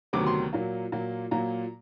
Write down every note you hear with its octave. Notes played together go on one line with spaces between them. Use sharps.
D2 C3 D#3 F#3 B3 D6
C6
A#2 F#3 A#3
A#2 F#3 A#3
A#2 F#3 A#3 A#5